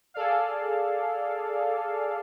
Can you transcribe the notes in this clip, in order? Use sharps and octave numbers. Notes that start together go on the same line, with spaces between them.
G#4 A4 D5 F5